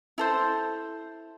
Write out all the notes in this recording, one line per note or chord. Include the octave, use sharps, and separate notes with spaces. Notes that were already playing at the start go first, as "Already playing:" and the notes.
E4 A4 C5